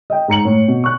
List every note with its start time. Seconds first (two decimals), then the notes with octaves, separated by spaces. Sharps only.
0.10 D#5 G5
0.28 G#2 A#5 C#7 F#7
0.45 A2
0.68 B2
0.84 C#6 F#6